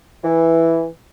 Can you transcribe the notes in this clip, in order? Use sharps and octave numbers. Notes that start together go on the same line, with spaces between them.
E3